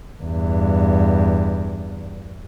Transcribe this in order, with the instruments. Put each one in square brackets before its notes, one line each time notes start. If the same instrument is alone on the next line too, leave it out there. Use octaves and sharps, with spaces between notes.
[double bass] E2 G2